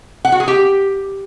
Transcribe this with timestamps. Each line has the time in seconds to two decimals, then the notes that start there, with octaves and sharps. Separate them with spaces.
0.25 F#5
0.32 F#4
0.40 G#4
0.48 G4